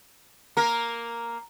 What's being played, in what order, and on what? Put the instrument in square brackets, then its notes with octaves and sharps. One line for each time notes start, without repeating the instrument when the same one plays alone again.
[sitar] A#3 A#4 [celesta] A#5